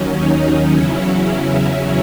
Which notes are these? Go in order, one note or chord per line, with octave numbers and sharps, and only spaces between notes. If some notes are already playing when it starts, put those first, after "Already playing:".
Already playing: D#2 D#3 F#3 C#4
D#4
E2 C#3 F#3 C#4 E4